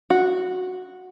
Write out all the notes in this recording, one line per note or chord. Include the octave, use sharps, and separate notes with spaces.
F#4